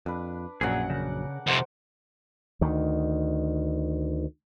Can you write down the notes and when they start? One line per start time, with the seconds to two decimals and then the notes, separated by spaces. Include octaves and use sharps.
0.06 F2 D4 B4
0.61 A#1 F#2 A#2 F#3 G#4 A#4 D5 F#5
0.90 C#3
1.47 F2 C3 A#4 C5 F#5
2.61 D2 D#3